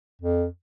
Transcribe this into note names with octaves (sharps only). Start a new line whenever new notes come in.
F2